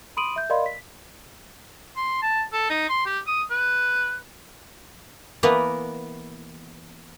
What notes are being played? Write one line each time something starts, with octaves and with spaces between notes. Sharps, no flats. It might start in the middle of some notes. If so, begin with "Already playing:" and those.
B5 C6 D#6 D7 D#7 F#7
E5 G6
A#4 D5 D#5 F5 B5 C6
B6
C6
A5
A4
D#4
C6
G4
D#6
B4
E3 A#3 B3 A#4 B4